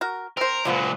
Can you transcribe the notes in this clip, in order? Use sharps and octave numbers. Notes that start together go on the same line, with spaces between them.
F#4 A#4
C4 A#4 C5
C#2 A#2 D3 F3 B3